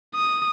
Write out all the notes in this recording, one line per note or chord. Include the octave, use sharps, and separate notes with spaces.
D#6